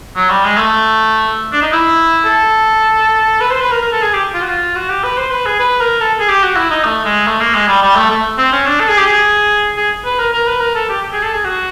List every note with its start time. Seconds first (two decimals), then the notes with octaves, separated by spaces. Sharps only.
0.16 F#3
0.30 G3
0.44 G#3
0.58 A3
1.53 D4
1.62 D#4
1.73 E4
2.25 A4
3.41 B4
3.51 C5
3.61 B4
3.72 A#4
3.82 A#4
3.92 A4
4.02 G#4
4.13 G4
4.34 F4
4.42 F#4
4.49 F4
4.75 F#4
4.90 G4
5.04 B4
5.17 C5
5.31 B4
5.46 G#4
5.59 B4
5.80 A#4
6.01 A4
6.20 G#4
6.29 G4
6.43 F#4
6.56 E4
6.71 D#4
6.85 A3
7.05 G#3
7.27 A3
7.40 A#3
7.55 G#3
7.68 G3
7.82 G3
7.96 A3
8.10 A3
8.38 C4
8.52 C#4
8.66 D4
8.80 A4
8.88 G#4
8.97 G4
9.06 G#4
9.77 G#4
10.05 B4
10.19 A#4
10.33 A#4
10.47 B4
10.61 A#4
10.75 A4
10.89 G4
11.02 G4
11.13 G#4
11.23 A4
11.34 G#4
11.44 F#4